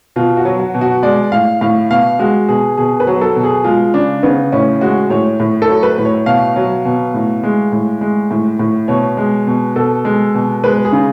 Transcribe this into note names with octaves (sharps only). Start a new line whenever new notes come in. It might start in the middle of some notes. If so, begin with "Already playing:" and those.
B2 F4
F#4
F#3
F#4
B2
F#4
G#3 D5
A2 F5
A2 F5
B2 F5
G#3 F#4
B2 G#4
B2 G#4
B4
F#3
A4
B2
G#4
G#3 F4
C#3 D4
C#3 B3
A2 C#4
G#3 F#4
A2 C#5
A2
A4
F#3
B4
A2
C#5
B2 F5
F#3
B2
A2
G#3
A2
G#3
A2
A2
B2 C#5
G#3
B2
B2 A4
G#3
B2
G#3 B4
G#4
C#3